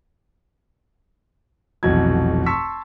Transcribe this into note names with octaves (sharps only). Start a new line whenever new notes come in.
F1 B1 F2 E3 F#4 G#6
A5 C6 C#6 E6 B6